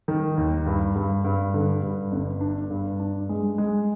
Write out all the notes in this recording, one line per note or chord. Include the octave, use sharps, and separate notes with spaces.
D#3
D#2
G2
G2
G2
D3
G2
G1
D4
G2
D4
G#3
G#3